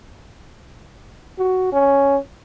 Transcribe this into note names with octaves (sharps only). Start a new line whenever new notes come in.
F#4
C#4